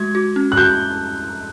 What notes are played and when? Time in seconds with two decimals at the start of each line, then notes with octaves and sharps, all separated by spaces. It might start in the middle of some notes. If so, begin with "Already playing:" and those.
Already playing: G#3 F#4 G#6
0.15 F#4
0.36 C#4
0.52 F#6
0.57 F#4 G6